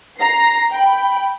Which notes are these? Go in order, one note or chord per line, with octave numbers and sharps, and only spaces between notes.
A#5 A#6 C7
G5 B5